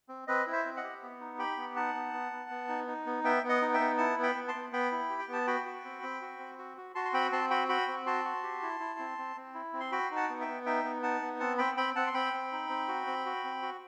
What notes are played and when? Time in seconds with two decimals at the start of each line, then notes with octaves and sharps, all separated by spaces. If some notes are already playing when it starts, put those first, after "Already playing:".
0.09 C4
0.27 C4 B4 D#5
0.47 E4
0.53 C5 E5
0.65 C4
0.77 D#5 F#5
0.84 G4
1.03 B3
1.21 D#4
1.38 G4 G5 B5
1.57 B3
1.76 D#4 F#5 A5
1.94 B3
2.13 B3
2.32 B3
2.50 B3
2.69 D#4
2.87 D#4
3.06 B3
3.24 B3 E5 G5
3.43 B3
3.49 D#5 F#5
3.62 D#4
3.74 E5 G5
3.80 B3
3.98 E4 F#5 A5
4.18 B3
4.23 G5 B5
4.35 B3
4.48 A5 C6
4.55 B3
4.72 B3 G5 B5
4.92 E4
5.09 G4
5.19 G5
5.28 B3
5.33 A5
5.47 F#4 G5 B5
5.66 F#4
5.85 C4
6.03 C4
6.22 F#4
6.39 C4
6.58 F#4
6.77 F#4
6.95 F#4 A5 C6
7.05 C6
7.13 C4 G5 B5
7.32 C4 A5 C6
7.50 F#4 G5 B5
7.69 F#4 G5 B5
7.88 C4
8.06 F#4 A5 C6
8.24 F#4
8.43 G4
8.63 E4
8.80 E4
8.99 C4
9.18 C4
9.36 C4
9.55 E4
9.73 C4
9.80 C6
9.92 F#4 G5 B5
10.11 D#4
10.16 F#5 A5
10.29 B3
10.41 E5 G5
10.48 B3
10.66 D#4 E5 G5
10.84 B3
11.02 D#4 F#5 A5
11.21 B3
11.40 C4 F#5 A5
11.58 C4 G5 B5
11.77 C4 G5 B5
11.96 C4 F#5 A5
12.07 C6
12.14 C4 G5 B5
12.33 C4
12.52 D#4
12.69 C4
12.88 F#4
13.07 C4
13.26 F#4
13.44 C4
13.62 F#4